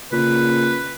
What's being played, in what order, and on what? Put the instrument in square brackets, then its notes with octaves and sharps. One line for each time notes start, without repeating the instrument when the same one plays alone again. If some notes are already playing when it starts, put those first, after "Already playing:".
[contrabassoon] A#2 [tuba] C#3 [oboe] B4